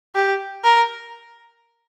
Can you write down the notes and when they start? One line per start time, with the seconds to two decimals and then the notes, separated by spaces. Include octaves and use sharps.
0.15 G4
0.64 A#4